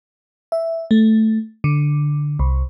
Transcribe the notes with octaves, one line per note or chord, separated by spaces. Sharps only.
E5
A3
D3
C2